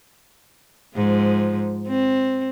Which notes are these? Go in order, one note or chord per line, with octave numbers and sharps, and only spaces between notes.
G#2 F3
C4